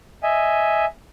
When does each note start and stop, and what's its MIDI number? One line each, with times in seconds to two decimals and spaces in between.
0.23 0.85 75
0.23 0.85 76
0.23 0.85 80